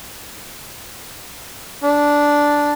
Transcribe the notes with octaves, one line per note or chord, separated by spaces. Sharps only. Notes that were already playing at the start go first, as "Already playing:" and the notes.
D4